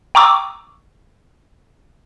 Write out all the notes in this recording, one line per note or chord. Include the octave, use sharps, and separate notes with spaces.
G5 A#5 C#6 D6 E6